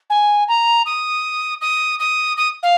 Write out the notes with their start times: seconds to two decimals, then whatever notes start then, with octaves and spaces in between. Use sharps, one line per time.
0.10 G#5
0.48 A#5
0.86 D#6
1.61 D#6
1.99 D#6
2.37 D#6
2.63 F5